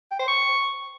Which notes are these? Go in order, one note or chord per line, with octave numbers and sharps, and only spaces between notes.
G5
C5
C#6